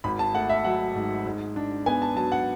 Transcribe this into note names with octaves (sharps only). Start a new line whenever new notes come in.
G#1 B5
A5
A3 F#5
E5
F#3 F#5
G#2
G#2
D4
B3 G#5
A5
F#3 A5
F#5